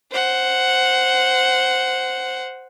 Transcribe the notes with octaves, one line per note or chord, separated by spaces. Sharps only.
C5 F#5